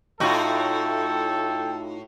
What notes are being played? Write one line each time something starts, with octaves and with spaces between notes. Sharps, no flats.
A2 D#4 F4 F#4 A4 G5